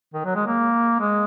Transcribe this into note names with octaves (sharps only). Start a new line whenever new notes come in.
D#3
F#3
G#3
A#3
G#3